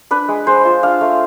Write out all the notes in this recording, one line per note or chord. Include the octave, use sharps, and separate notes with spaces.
D4 B4
G#3
G#3 C5
F4
D4 F5
A3